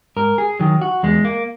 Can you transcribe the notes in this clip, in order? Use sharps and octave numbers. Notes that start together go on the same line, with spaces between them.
G#2 A#4
G#4
D#3 F#3
F#4
E2 G#3
A#3